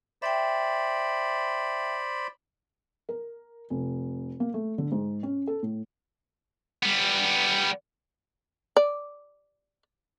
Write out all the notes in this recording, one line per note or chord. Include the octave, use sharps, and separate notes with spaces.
C5 D5 E5 G5 B5
A#4
F1
A#3
A3
D3
G#2
C#4
A4
A2
G3 B3
D5